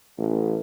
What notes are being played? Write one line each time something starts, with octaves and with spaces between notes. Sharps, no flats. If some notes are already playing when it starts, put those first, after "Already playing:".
A1